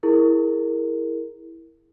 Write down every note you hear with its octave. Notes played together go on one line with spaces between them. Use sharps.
E4 G#4 A#4